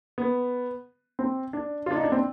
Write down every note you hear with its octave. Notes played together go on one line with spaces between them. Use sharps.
B3
C4
D4
F4
D4
D#4
D4
C4